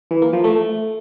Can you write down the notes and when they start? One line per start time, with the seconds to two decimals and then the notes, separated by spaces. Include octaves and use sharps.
0.11 E3
0.22 A#3
0.33 F3
0.44 A3